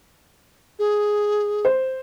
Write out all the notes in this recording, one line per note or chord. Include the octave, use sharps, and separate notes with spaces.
G#4
C5